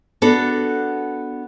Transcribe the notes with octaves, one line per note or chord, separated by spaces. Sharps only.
B3 D4 F#4 A4